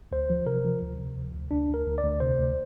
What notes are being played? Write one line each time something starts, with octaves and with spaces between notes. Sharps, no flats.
D2 C5
F3
C3 A#4
F3
D2
C3
D2
D2
D2 D4
D2 A#4
D2
D5
D2
C3 C5
D2